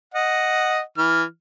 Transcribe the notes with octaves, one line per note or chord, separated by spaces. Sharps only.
D#5 F#5
E3 F6